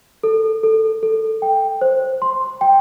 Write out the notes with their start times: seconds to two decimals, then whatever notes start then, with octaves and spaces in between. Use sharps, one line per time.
0.24 A4
0.63 A4
1.03 A4
1.42 G5
1.81 C5
2.22 C6
2.61 G5